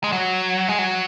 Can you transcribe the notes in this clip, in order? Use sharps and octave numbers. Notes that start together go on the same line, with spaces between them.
G#3
F#3
G#3
F#3